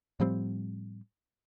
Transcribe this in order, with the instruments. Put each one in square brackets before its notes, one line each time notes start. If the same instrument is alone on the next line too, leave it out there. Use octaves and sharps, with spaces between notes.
[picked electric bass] A2 F3 G3 C4